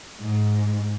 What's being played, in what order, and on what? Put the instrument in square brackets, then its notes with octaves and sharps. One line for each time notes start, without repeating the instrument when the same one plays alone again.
[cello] G#2